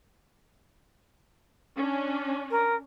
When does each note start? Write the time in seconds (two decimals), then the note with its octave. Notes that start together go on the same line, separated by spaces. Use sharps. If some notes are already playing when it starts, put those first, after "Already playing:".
1.77 C#4 D4
2.51 A#4